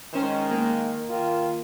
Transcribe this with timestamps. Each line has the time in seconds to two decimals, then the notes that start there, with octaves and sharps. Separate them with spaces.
0.14 D#3 G#3 C#4 C5
0.51 A#3
1.09 D#3 F4